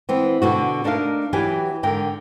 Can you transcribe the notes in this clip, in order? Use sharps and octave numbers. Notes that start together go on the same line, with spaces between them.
E3 B3 C4
B2 D3 F#4
A3 D4 D#4 A#4 F5
E3 F#3 B3 G4 G5 G#5
G#2 D3 A#4 G5